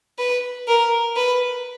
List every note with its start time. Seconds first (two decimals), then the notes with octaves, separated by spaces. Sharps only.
0.18 B4
0.67 A#4
1.16 B4